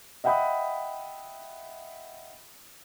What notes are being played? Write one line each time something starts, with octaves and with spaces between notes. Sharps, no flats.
D#5 E5 F#5 G5 B5 D#6